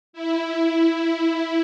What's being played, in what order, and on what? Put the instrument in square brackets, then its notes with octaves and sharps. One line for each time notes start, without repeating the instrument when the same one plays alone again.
[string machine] E4